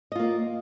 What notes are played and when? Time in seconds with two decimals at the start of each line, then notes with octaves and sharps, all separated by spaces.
0.12 D#5
0.15 F4
0.19 A#3